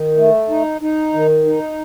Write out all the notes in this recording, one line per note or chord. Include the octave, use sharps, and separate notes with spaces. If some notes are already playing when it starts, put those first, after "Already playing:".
Already playing: D#3
A3
D#4
D#4
D#3
D#4